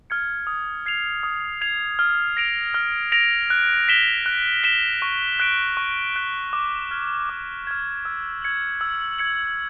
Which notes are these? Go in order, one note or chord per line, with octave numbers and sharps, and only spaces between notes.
F6 G#6 C#7
D#6
G#6 C7 F7
D#6
G#6 C7 F7
F6
A#6 D7 F7
F6
A#6 D7 F7
F#6
B6 E7 G7
F#6
B6 E7 G7
C#6
F#6 B6 D7
C#6
F#6 B6 D7
D6
F6 G#6
D6
F6 G#6
E6
G#6 C#7 F#7
E6
G#6 C#7 F#7